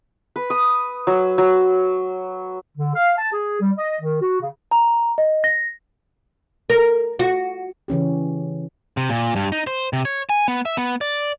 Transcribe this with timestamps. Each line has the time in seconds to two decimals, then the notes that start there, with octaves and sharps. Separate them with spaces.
0.36 B4
0.50 D#6
1.07 F#3
1.38 F#3
2.77 D3
2.95 F5
3.17 A5
3.33 G#4
3.61 G3
3.77 D#5
4.01 D#3
4.21 F#4
4.41 C#3
4.71 A#5
5.18 D#5
5.44 A#6
6.70 A#4
7.19 F#4
7.88 C#3 E3 C#4 G4
8.97 C3
9.10 A#2
9.36 G2
9.52 D#4
9.67 C5
9.93 C3
10.05 C#5
10.29 G#5
10.48 B3
10.65 E5
10.77 B3
11.01 D5